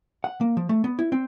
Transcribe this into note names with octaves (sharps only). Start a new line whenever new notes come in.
F#5
A#3
F3
A3
B3
E4
C4